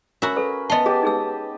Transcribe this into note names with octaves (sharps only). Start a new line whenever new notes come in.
C#4 F#4 A#4 E5 B5
A4 B4
B3 D#5 E5 A5 C6
G4 G#4 D#5 A5
D#4 G#4 E6